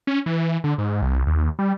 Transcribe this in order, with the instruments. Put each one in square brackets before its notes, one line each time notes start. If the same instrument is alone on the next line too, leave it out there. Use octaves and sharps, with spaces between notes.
[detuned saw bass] C#4
E3
D3
G#2
C2
D#2
G3